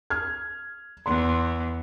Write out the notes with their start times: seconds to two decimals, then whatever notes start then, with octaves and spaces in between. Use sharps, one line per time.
0.10 F6 G#6
1.06 E2 C6